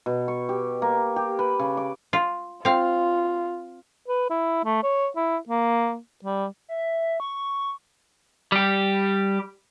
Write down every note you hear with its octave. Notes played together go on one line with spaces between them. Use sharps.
B2
C#6
G4
A#3
G4
B4
C#3
D6
F4
C4 F4 F5
B4
E4
A3
C#5
E4
A#3
G3
E5
C#6
G3 G4